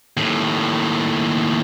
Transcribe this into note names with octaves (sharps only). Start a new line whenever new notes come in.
D#2 A2